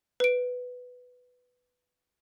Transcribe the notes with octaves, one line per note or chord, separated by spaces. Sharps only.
B4 D7